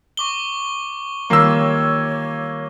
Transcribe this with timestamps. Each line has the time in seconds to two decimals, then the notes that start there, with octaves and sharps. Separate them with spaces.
0.17 C#6 D6 G7
1.30 D#3 G3 A#3 F4 C#5 E6